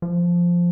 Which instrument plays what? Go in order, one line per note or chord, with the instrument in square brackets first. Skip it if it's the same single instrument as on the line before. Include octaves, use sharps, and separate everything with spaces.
[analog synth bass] F3